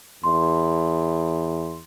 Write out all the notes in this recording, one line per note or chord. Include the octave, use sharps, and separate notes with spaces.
E2 C6